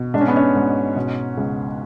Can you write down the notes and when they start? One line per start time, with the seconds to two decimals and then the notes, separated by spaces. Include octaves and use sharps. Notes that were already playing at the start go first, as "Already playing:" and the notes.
Already playing: B2
0.14 G#2 D4
0.21 C#4
0.28 B3
0.36 C#4
0.55 G#2
0.96 B2
1.37 C#2